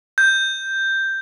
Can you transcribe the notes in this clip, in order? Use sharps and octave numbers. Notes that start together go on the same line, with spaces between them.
G6